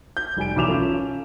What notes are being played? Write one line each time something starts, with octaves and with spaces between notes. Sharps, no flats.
G6
F1 G3 G#5 D7
B1 E3 D6 E7 F7
C#4 F4 A4